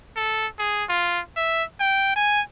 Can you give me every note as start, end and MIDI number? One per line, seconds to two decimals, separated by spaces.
0.17 0.47 69
0.59 0.84 68
0.89 1.20 65
1.36 1.64 76
1.80 2.12 79
2.16 2.41 80